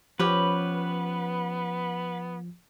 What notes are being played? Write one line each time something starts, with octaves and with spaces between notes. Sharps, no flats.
F3 B3 C#4 G4 B4